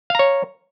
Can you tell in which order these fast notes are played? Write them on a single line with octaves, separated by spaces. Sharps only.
F5 A#5 C#5